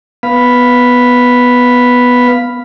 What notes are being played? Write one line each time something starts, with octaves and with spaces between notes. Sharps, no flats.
B3 F5 B5